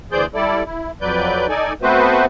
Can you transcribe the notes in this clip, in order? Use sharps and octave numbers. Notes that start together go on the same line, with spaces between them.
D2 E3 G#4 C5 D5 G6
G3 E4 A4 D5
E4
F2 F#3 B4 D5 G6
D#4 A4 D5 G#5
A3 B3 C4 F#4 B4 C5